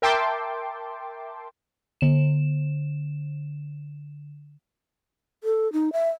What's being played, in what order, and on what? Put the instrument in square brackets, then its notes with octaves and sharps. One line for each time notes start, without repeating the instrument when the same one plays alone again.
[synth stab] A#4 E5 G5 A5 C6 D6
[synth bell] D3 E7
[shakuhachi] A4
D#4
E5